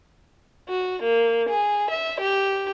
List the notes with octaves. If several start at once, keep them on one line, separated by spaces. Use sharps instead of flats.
F#4
A#3
G#4
E5
G4